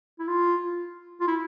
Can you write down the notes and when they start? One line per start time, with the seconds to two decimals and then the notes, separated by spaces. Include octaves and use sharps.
0.19 E4
0.28 F4
1.21 F4
1.28 E4